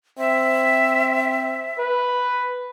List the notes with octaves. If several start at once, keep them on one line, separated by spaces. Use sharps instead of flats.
C4 E5
B4